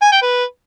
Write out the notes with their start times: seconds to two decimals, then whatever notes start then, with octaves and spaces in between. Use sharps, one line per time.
0.02 G#5
0.12 G5
0.22 B4